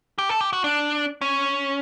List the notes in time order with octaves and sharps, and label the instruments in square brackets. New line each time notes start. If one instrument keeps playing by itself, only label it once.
[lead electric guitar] G4
A4
G4
F#4
D4
C#4